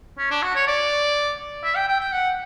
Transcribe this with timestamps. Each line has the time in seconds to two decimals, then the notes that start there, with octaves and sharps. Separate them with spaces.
0.18 C#4
0.30 D4
0.42 F#4
0.55 C#5
0.67 D5
1.64 E5
1.75 G5
1.88 G5
2.00 G5
2.12 F#5